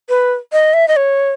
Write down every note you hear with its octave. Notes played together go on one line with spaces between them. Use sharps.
B4
D#5
E5
D#5
C#5